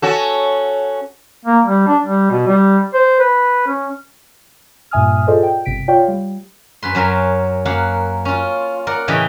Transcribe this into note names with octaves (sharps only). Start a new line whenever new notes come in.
C#4 F#4 A4
A#3
G3
D4
G3
B2
G3
C5
B4
C#4
G2 A#2 E5 G#5 D#6 F6
F4 G#4 A4 C5 D5 D#5
G5
G1 C3 B6 D7
F4 C#5 D5 F5 G5
G3
F#2 B4 C6
F#2 F#3 A#4 G#5
F#2 A#3 F5 F#5
C#4 F4
A#4 D5 F#5
A2 C#3 E3 G4 D#5 G5